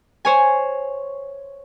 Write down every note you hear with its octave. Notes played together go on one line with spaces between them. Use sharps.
C5 C#5 G#5